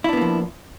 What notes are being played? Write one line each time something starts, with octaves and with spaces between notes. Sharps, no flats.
F3 A#3 B3 D4 E4